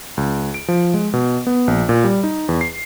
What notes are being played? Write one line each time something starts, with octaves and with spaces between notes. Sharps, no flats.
C#2
D7
F3
G#3
B2
B3
A#1
A#2
G3
D#4
E2
C7